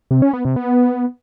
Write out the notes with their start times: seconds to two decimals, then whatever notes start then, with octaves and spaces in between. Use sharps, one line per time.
0.11 C3
0.22 C#4
0.33 B3
0.45 C3
0.56 B3